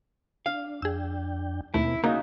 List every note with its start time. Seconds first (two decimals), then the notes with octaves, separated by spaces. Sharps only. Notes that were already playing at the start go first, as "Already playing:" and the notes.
0.46 D4 F5
0.82 F2 D4 G#4 G5 E6
1.74 D#2 B2 A3 A#3 C4 E4
2.04 C#3 A#3 D#4 F#4 E5